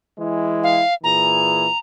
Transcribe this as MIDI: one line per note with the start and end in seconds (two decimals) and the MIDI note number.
0.18 0.82 52
0.18 0.82 56
0.18 0.82 64
0.63 0.94 77
1.04 1.68 46
1.04 1.68 52
1.04 1.68 68
1.04 1.78 82